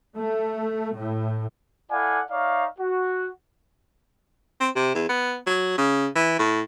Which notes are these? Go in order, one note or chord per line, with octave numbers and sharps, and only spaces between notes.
A3
A2
E4 A4 D5 F5 F#5 G#5
D#4 C#5 D5 E5 F5
F#4
C4
C3
E2
B3
F#3
C#3
E3
A2